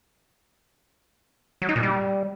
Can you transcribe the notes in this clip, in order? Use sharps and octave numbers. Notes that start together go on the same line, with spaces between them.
F#3
D#4
A#2
G3